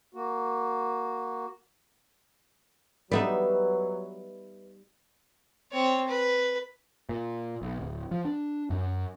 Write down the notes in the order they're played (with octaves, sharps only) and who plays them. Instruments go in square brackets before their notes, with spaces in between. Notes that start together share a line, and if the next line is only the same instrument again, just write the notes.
[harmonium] A#3 F#4
[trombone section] F#3 [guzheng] G3 B3 D#4 [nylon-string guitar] B4 E5
[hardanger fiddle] C4 C#5
B4
[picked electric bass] A#2
B1
D1
F3
D4
F#2